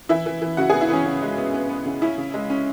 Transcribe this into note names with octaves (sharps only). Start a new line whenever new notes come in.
E3 E4 E5
E3
E3
C#3 F#4 F#5
G#4 G#5
B3
E4 E5
E3 C#4 B4 C#5
C#3
G#3
B3
B3
B3
C#3
C#4 E4
C#3
G#3
C#4